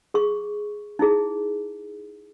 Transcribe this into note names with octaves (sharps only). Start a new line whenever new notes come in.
G#4 C#6
D#4 E4 G#4